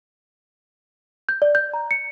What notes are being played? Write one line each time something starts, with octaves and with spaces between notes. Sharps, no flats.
G6
D5
G6
A#5
C#7